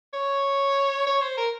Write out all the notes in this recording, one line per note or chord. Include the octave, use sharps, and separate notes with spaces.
C#5
C#5
C5
A#4